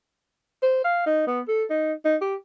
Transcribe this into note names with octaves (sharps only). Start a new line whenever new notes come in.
C5
F5
D#4
B3
A4
D#4
D#4
G4